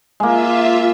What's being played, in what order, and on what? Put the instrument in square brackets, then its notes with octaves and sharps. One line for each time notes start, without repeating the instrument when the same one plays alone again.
[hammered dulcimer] G#3 A#3 [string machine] F4 E5